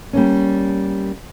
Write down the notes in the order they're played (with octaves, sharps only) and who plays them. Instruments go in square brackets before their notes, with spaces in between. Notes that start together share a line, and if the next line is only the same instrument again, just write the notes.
[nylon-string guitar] G3 A#3 C#4